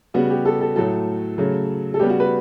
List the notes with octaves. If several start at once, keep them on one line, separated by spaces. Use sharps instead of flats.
C#3 G3 B3 F#4
G4
A4
A4
A2 F#3 A3 A4
C#3 F#3 A3
A4
C#3 G3 B3 G4
F#4
B4